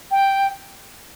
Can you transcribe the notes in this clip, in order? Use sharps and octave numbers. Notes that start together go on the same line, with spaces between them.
G5